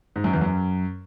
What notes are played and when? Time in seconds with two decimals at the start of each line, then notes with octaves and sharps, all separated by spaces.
0.16 G#2
0.24 F#2
0.33 E2
0.42 F#2